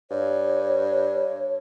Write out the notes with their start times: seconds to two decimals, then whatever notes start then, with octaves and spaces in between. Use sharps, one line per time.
0.11 G2 C#5